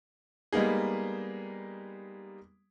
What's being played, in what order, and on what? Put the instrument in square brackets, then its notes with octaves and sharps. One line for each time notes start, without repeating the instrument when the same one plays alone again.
[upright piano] G3 G#3 A#3 B3 D#4 G#4